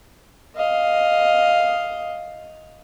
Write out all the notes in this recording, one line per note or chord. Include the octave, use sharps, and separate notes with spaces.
D#5 F5